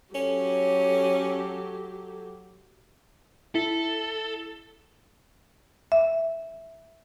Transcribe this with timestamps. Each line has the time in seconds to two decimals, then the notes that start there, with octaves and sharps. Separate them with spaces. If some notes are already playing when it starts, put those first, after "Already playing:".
0.15 F#3 C#4 G4 A4
3.55 E4 A4
5.92 E5